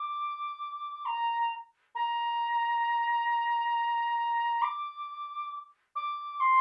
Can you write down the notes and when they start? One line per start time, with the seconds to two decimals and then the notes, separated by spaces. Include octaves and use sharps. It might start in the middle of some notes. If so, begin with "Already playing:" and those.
Already playing: D6
1.05 A#5
1.95 A#5
4.61 D6
5.95 D6
6.40 C6